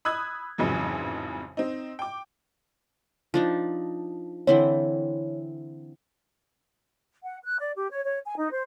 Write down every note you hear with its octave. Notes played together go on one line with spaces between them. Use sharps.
B5 D#6 E6 F#6 G#6
A1 F2 G#2 C#3 E3 F#3
C4 D#4
G5 D6
F3 D4 D#4
D3 E3 C4 C#5
F#5
F#6
D5
G4
C#5
C#5
G#5
D#4
C5